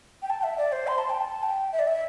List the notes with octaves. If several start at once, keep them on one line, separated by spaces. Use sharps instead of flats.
G5
A5
G5
E5
D5
C5
C6
A5
G5
A5
G5
E5
D5
E5